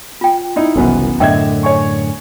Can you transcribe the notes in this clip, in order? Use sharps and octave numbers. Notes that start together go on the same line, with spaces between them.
F4 G5
D#4 E4
F#1 C2 F#2 E3 B3
F#2 A2 D3 D#5 E5 G5 G#6
C#5 G#5 C#6